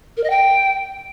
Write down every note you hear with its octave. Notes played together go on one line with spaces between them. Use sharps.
A#4
D#5
G5